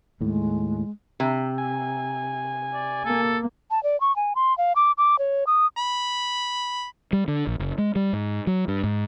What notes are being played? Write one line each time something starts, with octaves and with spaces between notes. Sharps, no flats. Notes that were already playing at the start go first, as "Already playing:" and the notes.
D#2 A2 G#3
C3
G#5
D5
A#3 A4
A5
D5
C#6
G#5
C6
F5
D6
D6
C#5
D#6
B5
G3
D3
A#1
F#1
G#3
G3
G#2
F#3
G2
G#2